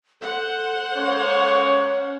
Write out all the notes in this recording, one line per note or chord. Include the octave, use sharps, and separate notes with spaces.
A4 C5 F#5
G#3 A#3 C#4 C#5